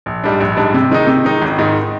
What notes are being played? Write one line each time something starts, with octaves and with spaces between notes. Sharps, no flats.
A#1
G#2 G3 D4
A#1
G#2 G3 D4
C3
D#3 G#3 D#4
C3
D#3 G#3 D#4
G#1
G#2 D#3